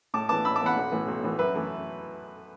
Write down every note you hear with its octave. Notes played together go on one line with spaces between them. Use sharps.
A2 A5 D6
E3 B3 A5 D6
A2 B5 E6
A5 D6
E3 B3 F#5 B5
B1
A2 E3 B3
B1
A2 E3 B3
F#2 B4 E5
E3 A3 E4